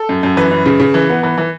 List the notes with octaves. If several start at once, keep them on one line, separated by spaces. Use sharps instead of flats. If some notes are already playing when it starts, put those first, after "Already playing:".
Already playing: A4
F#2
F#2
E3 B4
F#2
C#3
C#3
E3
B3
E3
E3